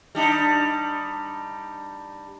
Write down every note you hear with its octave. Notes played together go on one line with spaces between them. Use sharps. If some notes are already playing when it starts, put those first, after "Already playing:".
G3 D4 D#4